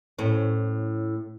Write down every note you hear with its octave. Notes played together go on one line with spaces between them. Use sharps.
A2 C#4